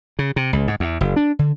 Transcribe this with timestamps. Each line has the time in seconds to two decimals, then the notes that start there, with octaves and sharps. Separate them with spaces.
0.19 C#3
0.36 C3
0.53 C#2
0.68 G#2
0.80 E2
1.01 F#1
1.16 D4
1.39 D3